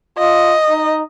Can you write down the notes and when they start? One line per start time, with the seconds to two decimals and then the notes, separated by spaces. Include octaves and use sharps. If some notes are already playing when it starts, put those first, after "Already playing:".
0.18 F4 D#5
0.69 D#4